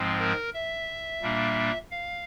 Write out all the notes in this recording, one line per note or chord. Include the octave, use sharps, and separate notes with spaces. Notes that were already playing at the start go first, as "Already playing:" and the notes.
Already playing: G#2 F3 G#3 C4
A#4
E5
A#2 G3 A#3 D4
F5